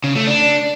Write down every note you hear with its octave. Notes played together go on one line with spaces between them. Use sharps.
C#3
A3
D4